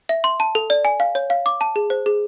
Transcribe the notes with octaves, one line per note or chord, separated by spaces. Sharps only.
E5
C6
A5
A4
D5
G#5
F5
C#5
F5
D6
A5
G#4
C5
G#4